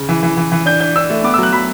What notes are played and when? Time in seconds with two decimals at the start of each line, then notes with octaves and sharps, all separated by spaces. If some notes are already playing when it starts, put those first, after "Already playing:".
Already playing: C#3
0.09 E3
0.23 E3
0.37 E3
0.52 E3
0.66 D4 G6
0.80 D4 G6
0.96 D4 E6
1.10 A3
1.24 B3 D6
1.34 F#3 E6
1.43 F#6
1.52 F#3 B5